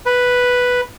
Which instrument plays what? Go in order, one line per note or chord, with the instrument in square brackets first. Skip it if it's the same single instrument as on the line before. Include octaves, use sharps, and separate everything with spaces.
[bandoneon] B4